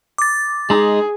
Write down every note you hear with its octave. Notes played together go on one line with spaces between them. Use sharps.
D6 A6
G#3 D#4 G#4